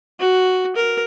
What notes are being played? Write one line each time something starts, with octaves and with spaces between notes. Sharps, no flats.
F#4
A#4